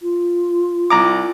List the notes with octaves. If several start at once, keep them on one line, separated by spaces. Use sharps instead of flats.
F4
C2 A#5 D6